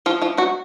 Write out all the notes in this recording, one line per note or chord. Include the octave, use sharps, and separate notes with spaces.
F3 F4
F3 F4
F#3 F#4